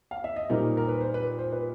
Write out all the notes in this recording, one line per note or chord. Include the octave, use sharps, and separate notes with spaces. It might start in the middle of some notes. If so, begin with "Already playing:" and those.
F5
E5
D#5
A#2 G3 C4 D#4 A#4
A#4
B4
C5
B4
C5
B4